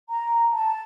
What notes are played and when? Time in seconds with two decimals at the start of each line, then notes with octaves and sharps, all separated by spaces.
0.10 A#5
0.54 A5